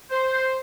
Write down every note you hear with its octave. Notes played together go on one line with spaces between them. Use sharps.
C5